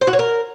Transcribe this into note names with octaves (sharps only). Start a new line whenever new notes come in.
C5
F#4
C#5
A#4